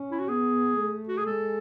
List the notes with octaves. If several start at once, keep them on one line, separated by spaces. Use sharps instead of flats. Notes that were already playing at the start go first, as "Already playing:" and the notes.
Already playing: C#4
E4
F#4
B3 G#4
A3
F#4
G#4
G#3 A4